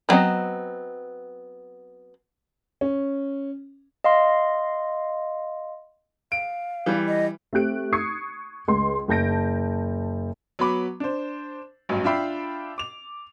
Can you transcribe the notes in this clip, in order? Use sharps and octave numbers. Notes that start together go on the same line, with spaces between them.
D#3 F#3 B3 C4 D#5
C#4
D#5 F5 C6
F5 D7
E3 G3
D#5
A3 C4 G4 F#6 D7
C#6 D#6 G#6 C7 C#7
C#2 C6
F#1 A5 G6 A#6 D7
F#3 B3 B5 D6
D4 C5
A1 G2 F#3
D4 F4 E5 G5 B5 C7
D6 F7